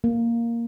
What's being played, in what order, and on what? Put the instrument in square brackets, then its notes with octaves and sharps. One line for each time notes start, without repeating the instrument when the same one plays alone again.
[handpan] A#3